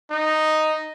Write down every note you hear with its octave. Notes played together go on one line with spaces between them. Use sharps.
D#4